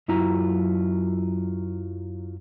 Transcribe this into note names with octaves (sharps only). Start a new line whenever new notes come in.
F#2 F#3 E4 F4 A#5